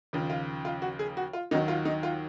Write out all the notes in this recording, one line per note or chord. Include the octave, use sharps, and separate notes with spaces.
D#2 C#3 F3
F4
F4
F#4
G#4
F#4
F4
D#2 D#3 F#3 D#4
F4
D#4
F4